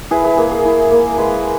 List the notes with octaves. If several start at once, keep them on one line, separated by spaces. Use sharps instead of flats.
E4 G#4 B4
G#4 B4
A#3 G#4
G#4
E4
A#3
G#3 G#4 B4